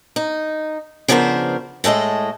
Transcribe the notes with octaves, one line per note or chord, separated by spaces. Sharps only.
D#4
C#3 F3 B3 D4 A#4 C5
A2 G#3 A4 D#5